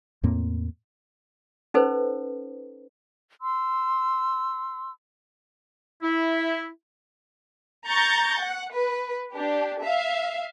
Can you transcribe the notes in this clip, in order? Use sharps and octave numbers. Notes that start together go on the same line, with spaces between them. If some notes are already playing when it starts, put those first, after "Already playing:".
E2 A2 A#3 C4
C#4 D#4 A4 B4 C5
C6 E6
E4
A#5 C#6 G6 A6 A#6
F#5
B4
D4 G4
E5 F5